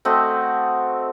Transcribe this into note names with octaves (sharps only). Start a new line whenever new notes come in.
A3 C4 F#4 D#5